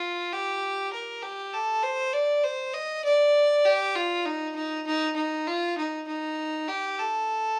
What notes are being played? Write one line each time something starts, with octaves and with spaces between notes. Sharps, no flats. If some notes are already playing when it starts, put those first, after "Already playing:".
Already playing: F4
G4
A#4
G4
A4
C5
D5
C5
D#5
D5
G4
F4
D#4
D#4
D#4
D#4
F4
D#4
D#4
G4
A4